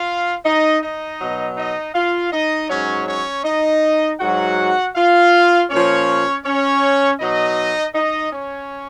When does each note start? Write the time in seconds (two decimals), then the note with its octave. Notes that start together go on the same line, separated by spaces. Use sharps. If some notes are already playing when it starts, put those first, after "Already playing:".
Already playing: F4 F5
0.45 D#4 D#5
0.82 D#4 D#5
1.20 B2 F#3
1.57 D#4 D#5
1.95 F4 F5
2.32 D#4 D#5
2.70 G#2 F#3 C#4 C#5
3.07 C#4 C#5
3.45 D#4 D#5
4.20 G#2 F#3 F#4 F#5
4.95 F4 F5
5.70 A#2 F3 C#4 C#5
6.45 C#4 C#5
7.20 B2 F#3 D#4 D#5
7.95 D#4 D#5
8.33 C#4 C#5